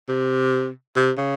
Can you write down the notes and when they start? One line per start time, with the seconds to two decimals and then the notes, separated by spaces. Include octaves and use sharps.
0.09 C3
0.96 C3
1.18 C#3